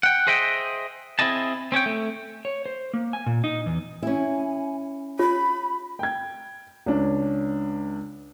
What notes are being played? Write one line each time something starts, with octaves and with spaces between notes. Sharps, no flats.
F#5 G5
G#4 C5 D#5 E5 F#5 G5
C4 E4 G#4 D#5 A5
C4 C#4 C#5 G5
A3
C#5
C5
A#3
G#5
A#2
D#4
E2
C#4 E4 G#5
F4 C#5 B5
G5 G#6
C#2 C#4 D4